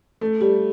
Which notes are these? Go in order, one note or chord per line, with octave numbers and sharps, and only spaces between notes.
A3
G3